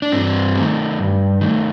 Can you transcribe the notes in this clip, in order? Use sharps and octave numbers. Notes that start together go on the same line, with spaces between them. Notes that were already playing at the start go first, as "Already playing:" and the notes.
D4
G2 C4
D#3 A3
G2
D#3 A3